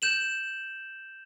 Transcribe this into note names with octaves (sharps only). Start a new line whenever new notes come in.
G6 E7 F#7